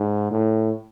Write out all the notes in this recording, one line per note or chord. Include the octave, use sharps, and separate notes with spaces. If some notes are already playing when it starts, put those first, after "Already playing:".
Already playing: G#2
A2